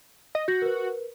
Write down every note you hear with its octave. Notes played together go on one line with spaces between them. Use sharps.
D#5
F#4 G6 A#6
A#4 B4